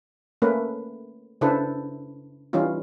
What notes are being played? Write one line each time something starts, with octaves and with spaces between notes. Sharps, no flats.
A3 A#3 C#4 A#4 B4
C#3 D4 E4 A4 B4 C5
E3 G3 C#4 D#4 F4